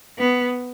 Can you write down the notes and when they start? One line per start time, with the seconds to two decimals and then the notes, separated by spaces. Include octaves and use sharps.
0.19 B3